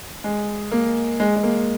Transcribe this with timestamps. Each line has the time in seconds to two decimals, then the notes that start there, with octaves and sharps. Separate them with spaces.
0.24 G#3
0.72 A#3
1.20 G#3
1.36 G#3
1.43 A#3